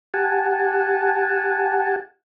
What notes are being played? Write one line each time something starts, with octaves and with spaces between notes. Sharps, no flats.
G4 F#5 G#5 A5